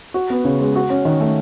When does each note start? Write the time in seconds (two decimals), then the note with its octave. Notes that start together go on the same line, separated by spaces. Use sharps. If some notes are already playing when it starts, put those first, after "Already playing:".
0.14 F#4
0.30 B3
0.45 C#3
0.60 G#3
0.76 F#4
0.90 C#4
1.05 D#3
1.21 A3